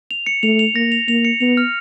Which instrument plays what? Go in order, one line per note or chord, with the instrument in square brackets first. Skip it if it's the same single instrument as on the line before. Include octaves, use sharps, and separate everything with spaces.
[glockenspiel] F7
C#7
[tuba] A3 [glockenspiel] F7
[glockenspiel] F7
[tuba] A#3 [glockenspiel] A#6
[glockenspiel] F7
[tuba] A#3 [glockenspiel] F7
[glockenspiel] C#7
[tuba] B3 [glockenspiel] F7
[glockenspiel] F6